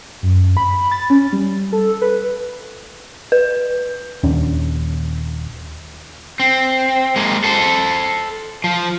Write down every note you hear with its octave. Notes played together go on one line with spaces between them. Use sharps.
F#2
B5
A6
C#4
G3
A4
B4
B4
D#1 D#2 C#4 D4
C4
G#3 A#3
A4 C5
F3